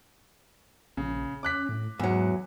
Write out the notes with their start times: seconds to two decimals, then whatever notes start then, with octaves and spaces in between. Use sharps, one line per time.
0.97 A#1 C#3
1.43 C#4 D6 F#6 B6
1.69 A2
1.99 E2 G#2 F#3